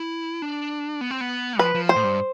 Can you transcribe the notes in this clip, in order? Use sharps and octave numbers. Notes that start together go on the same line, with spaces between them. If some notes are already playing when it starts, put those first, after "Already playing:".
Already playing: E4
D4
B3
C4
B3
F3 B4
F3
C5
A2
G2